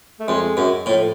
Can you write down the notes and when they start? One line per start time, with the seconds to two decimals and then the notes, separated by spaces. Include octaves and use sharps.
0.20 A3
0.28 F2 G#3
0.57 F#2
0.86 A2 F3